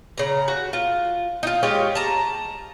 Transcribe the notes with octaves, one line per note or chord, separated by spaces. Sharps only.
C#3 A#5
F#4
F4
D#4 F4
G#3 F4 G4 C#5
A5 A#5